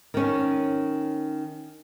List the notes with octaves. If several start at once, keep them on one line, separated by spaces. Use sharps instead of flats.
D#3 C#4